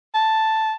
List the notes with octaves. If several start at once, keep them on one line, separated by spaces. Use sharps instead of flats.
A5